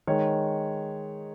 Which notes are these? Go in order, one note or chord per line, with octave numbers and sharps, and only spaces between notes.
D#3 G#3 C#5